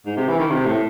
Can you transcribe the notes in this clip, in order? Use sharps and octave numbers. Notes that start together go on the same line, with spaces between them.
G#2
C3
E3
D#3
C3
A2